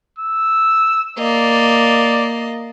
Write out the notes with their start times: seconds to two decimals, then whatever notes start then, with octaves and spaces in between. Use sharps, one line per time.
0.18 E6
1.18 A#3 D5 D#5